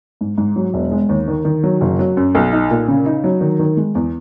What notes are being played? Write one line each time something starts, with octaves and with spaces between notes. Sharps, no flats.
G#2
G#2
F#3
E1
G#3
D#2
D#3
D#3
F#3
F#1
F#3
F#2
B1
D#4
A#2
C#3
D#4
F#3
D#3
D#3
G#3
E2